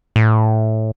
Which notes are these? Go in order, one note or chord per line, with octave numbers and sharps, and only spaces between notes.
A2